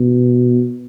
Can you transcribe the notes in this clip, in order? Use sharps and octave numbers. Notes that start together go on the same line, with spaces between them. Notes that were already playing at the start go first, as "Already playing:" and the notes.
Already playing: B2